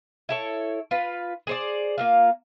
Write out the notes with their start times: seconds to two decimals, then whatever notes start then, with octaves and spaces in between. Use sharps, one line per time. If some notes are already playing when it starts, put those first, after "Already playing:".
0.29 E4 A4 C#5
0.91 F4 B4
1.47 G#4 C5 D5
1.98 A#3 F4 F5